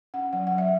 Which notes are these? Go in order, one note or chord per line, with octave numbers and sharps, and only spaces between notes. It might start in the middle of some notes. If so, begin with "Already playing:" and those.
C#4 F#5
F#3 F#5
F#3 F#5
E5